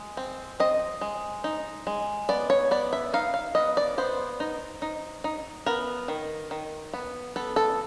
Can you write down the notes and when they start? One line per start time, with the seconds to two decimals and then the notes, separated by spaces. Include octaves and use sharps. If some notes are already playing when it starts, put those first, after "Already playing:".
Already playing: G#3
0.17 C4
0.60 C4 D#5
1.01 G#3
1.44 D#4
1.87 G#3
2.29 B3 D5
2.50 C#5
2.71 B3 D5
2.93 E5
3.14 D#4 F5
3.34 F5
3.55 B3 D#5
3.77 D5
3.98 B3 C5
4.40 D#4
4.82 D#4
5.24 D#4
5.66 B3 A#4
6.08 D#3
6.51 D#3
6.93 B3
7.36 B3 A4
7.56 A4